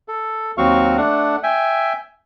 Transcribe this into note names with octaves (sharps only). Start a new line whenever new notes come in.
A4
D#2 F#3 C4 F#4 F5 C#6
A3 D4 F#5
E5 G5 G#5